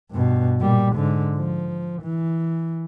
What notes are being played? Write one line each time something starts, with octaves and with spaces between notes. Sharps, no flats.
G2 B2
A#2 G3
G#2 D3
F3
E3